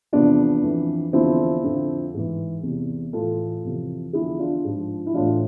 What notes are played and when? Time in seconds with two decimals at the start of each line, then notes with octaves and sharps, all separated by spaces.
0.13 E2 C3 F3 B3 D4
0.63 F2 E3
1.13 E2 D3 F3 C4 E4
1.63 F2 D3 F3
2.14 G#2 E3
2.63 E2 C3 E3
3.13 A2 E3 F4 A4
3.63 F2 C3 E3
4.13 E2 D3 F3 E4 G#4
4.39 D4 F4
4.64 G#2 F3
5.06 E4
5.14 A2 E3 D4 F4